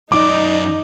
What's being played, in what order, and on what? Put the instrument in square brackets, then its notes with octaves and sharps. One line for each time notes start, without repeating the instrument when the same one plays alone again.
[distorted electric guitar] F#2 D5 [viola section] D#4 [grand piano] D6